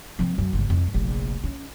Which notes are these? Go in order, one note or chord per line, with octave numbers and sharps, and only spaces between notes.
F3 C4
F#2
G1 C#2
F2 E4
F1 A#1
C#4